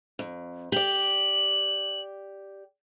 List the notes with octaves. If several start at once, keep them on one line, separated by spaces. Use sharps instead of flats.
F2
G4 D5 F#7